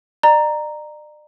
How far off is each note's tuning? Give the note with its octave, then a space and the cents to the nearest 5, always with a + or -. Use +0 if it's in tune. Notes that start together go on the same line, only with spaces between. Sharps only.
D5 +40 A#5 +0